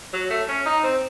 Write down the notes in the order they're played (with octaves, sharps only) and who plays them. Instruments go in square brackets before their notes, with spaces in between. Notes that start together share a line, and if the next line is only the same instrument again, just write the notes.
[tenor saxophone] F#3
A3
C#4
D#4
C4